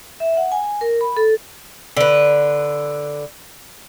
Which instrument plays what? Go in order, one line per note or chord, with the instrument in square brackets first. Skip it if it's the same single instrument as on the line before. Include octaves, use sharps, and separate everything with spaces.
[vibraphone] E5
F#5
G#5
A#4
B5
A4
[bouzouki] D3 B4